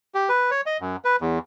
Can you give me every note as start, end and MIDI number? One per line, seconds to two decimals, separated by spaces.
0.15 0.29 67
0.29 0.51 71
0.51 0.61 73
0.66 0.77 75
0.80 0.96 42
1.05 1.16 71
1.21 1.39 40